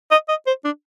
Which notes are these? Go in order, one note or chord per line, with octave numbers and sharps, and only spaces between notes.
D#5
D#5
C5
D4